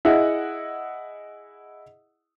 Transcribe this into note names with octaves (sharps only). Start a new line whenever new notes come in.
E4 G#4 D#5 F#5